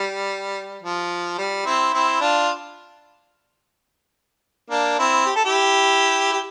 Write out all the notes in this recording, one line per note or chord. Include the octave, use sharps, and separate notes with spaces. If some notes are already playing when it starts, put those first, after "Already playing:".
Already playing: G3
F3
G3
C4 E4
C4 E4
D4 F4
A#3 D4
C4 E4
G4
A4
E4 G4
G4